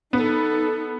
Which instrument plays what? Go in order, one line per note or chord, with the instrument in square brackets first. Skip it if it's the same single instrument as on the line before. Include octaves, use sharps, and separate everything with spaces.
[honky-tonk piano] B3 [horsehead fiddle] D#4 A4